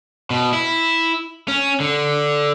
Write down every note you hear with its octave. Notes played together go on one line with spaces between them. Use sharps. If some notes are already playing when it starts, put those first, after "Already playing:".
B2
E4
C#4
D3